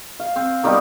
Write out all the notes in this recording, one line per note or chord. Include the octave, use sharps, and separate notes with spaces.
F5
C4
D#3 G3 B3 D#4